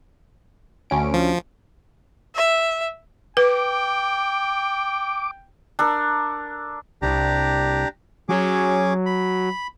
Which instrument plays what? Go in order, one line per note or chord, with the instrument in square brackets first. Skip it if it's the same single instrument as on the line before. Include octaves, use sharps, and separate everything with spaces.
[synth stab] D2 C#4 D7
[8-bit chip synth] F3
[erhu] E5
[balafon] B4 [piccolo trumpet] G5 [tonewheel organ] D6
[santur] D4 A4 A#4
[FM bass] C2 [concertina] D4 G4 A#5
[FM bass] F#3 [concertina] C#4 G#4 D6
[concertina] B5